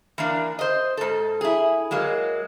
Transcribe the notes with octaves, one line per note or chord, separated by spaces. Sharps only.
E3 A#3 D4
C5 D#5
G#2 A4
E4 G#4
F#3 G#3 A#3